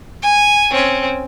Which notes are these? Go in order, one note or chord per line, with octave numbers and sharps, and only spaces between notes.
G#5
C4 C#4